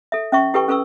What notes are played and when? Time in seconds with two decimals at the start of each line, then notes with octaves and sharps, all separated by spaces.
0.12 A4 E5
0.32 C#4 E5 C#6
0.54 E4 G4 A4 B4 G5 C#6
0.68 C#4 A4 B4 C#6 E6